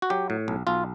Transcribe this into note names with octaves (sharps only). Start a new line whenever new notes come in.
F#4
F#3 G4
A2
B1
B1 F4